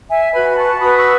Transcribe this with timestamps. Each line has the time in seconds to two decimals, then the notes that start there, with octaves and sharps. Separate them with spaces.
0.09 E5 G#5
0.32 F#4 B4 G#5 B5
0.50 B5
0.57 A5 C#6
0.81 F#4 B4 B5 D#6
0.97 C#6 E6